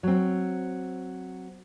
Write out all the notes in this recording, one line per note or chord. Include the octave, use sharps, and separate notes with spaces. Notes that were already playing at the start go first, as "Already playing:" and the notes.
F#3 C4